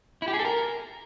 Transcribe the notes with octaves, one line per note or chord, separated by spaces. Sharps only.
E4
G4
G#4
A4
A#4